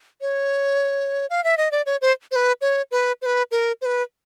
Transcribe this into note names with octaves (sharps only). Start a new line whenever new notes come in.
C#5
F5
E5
D#5
D5
C#5
C5
C5
B4
C#5
B4
C5
B4
A#4
C5
B4